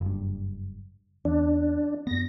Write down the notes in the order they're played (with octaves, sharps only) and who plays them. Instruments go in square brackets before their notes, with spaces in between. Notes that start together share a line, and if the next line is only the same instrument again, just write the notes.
[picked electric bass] F#1 G2
[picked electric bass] E2 [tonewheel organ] D4
[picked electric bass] F#2 B3 [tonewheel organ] A#6